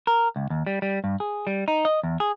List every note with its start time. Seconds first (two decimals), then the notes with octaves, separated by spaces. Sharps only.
0.07 A#4
0.36 C#2
0.50 D#2
0.66 G3
0.82 G3
1.04 G2
1.20 G#4
1.47 G3
1.68 D#4
1.85 D#5
2.03 E2
2.20 G#4